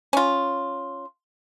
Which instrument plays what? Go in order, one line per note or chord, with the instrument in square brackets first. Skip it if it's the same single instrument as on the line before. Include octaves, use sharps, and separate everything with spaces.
[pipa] C#4 F4